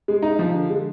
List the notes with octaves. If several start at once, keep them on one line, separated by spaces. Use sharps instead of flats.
G#3
D#4
F3
D3
G#3